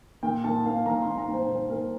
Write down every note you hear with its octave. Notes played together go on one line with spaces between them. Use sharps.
A#2 G5
A#2 A5
A#2 F5
A#2 A#5
C6
A#2
A#5
A#2
C5
A#2 C5
A#2 A#4